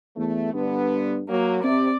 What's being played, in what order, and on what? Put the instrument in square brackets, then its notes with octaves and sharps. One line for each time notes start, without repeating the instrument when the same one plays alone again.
[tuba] E2 [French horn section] A3
[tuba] G2 [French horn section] D3 B3
[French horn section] F#3 [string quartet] A#3
[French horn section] C3 [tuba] C4 [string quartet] D5